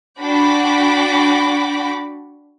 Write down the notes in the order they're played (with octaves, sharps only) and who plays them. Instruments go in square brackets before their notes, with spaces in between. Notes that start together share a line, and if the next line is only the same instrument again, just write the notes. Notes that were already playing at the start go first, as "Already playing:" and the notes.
[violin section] D4 F#4 F#5 G5 B5 D6